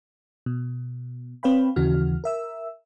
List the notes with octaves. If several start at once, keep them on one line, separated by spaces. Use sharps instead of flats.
B2
C4 B4 C#5 F5 G5 B5
D#2 C#3 E3 F#4 F6
A#4 E5 E6